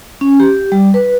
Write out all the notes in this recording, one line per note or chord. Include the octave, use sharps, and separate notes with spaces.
C#4
G4
G3
B4